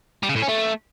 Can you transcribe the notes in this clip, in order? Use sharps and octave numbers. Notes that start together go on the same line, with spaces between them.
G3
C#3
A2
C#4
A3